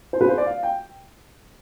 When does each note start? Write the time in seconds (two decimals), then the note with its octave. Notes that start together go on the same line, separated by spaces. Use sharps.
0.13 C5
0.21 B4
0.29 C5
0.38 D5
0.46 F5
0.63 G5